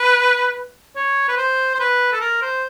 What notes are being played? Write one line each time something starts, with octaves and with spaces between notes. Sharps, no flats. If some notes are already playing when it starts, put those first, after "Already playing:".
Already playing: B4
C#5
B4
C5
C5
B4
A4
A#4
C5